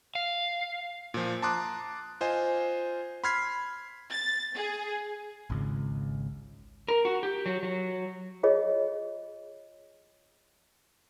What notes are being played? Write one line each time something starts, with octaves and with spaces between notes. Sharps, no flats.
F5
A#2 F3
A5 A#5 C6 D6 D#6 F#6
F4 C5 D#5 G#5
B5 C6 F6 G#6 B6 C7
A6
G#4
G#1 C#2
A#4
F#4
G4
F#3
F#3
F4 G#4 C#5 D#5